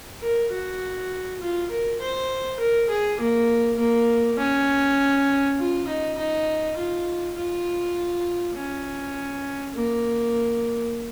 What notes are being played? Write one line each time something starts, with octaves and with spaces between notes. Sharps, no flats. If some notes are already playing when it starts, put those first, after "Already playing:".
A#4
F#4
F4
A#4
C5
A#4
G#4
A#3
A#3
C#4
F4
D#4
D#4
F4
F4
C#4
A#3